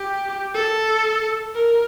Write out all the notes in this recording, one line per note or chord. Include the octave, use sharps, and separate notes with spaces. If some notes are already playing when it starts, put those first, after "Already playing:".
Already playing: G4
A4
A#4